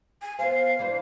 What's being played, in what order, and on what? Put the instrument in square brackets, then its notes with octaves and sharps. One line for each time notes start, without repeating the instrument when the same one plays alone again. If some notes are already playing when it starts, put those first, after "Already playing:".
[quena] G#5
[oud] B3 C5 [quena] F5
[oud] E3 D4 C5